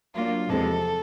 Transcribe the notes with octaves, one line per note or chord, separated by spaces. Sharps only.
F#3 A#3 D4 F4
E2 C3 F3 G#3 A4